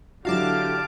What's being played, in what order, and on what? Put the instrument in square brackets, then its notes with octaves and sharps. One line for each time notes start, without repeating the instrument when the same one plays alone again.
[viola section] D3 G4 [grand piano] F#3 E4 F#4 [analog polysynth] F5 A5 D6